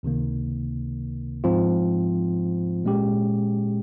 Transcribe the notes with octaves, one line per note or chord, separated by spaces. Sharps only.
C#2 C3 D#3 A#3
G#2 F3 C4 F4
A#2 G#3 C#4 G4